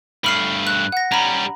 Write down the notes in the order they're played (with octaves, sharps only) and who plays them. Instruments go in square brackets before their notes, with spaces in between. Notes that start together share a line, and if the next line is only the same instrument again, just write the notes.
[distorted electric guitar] G2 A3 [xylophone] B5 F6 C7
[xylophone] F#6
F#5 A#6
[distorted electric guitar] G3 C#4 [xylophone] A#5 B5